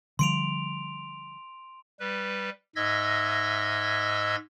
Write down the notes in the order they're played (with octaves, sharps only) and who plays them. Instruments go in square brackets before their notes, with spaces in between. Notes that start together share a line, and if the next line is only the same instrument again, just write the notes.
[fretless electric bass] D3 F3 G3 [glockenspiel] C6 D7 F7
[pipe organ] G3 B4
G#2 D#5 E5 E6 G#6 A#6